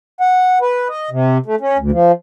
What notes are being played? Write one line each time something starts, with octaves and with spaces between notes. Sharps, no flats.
F#5
B4
D#5
C3
A3
C#4
D2
F3